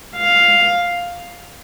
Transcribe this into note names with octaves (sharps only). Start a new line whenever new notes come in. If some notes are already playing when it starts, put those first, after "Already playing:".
F5